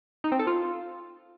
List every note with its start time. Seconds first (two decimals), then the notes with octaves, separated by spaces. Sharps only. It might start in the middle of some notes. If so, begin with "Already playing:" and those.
0.24 D#4
0.32 C4
0.39 A4
0.47 F4